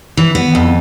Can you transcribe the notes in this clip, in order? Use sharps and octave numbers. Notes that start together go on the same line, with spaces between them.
E3
B3
F2